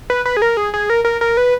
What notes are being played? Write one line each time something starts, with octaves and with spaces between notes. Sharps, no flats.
B4
B4
G#4
A#4
G#4
G#4
A#4
A#4
A#4
B4